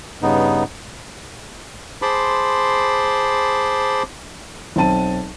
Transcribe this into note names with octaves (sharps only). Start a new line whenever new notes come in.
G2 C#3 B3 D#4
G#4 C5 A5 B5 C6 D6
B1 C4 A5 D#7